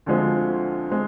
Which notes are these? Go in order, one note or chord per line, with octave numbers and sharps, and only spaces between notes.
D2 D3 F3 G#3 C4
G#3 C4